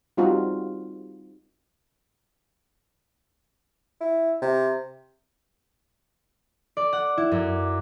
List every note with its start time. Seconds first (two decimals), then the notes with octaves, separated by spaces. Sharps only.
0.17 G3 C4 D#4 F4 F#4
4.01 E4
4.42 C3
6.77 D5
6.93 F#5
7.18 E4
7.32 F#2